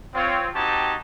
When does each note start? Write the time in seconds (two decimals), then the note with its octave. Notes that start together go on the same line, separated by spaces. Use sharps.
0.15 C4 F4 C#5
0.54 C4 D#4 F#4 G4 G#5 A5